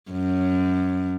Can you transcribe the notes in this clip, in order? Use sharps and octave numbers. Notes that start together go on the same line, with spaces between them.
F#2